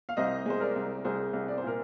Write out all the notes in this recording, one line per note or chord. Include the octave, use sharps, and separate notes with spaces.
F5
C2 C5 D#5
G#3 C5
A#4 D5
C2
C2 G#4 C5
C2
D5
C5
A#2 A#4